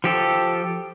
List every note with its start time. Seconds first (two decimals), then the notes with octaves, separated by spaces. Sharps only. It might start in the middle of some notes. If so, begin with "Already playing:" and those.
0.04 F3 G4 A4